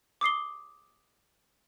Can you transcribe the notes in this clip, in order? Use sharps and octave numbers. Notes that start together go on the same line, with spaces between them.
D6 D#6 C7 G7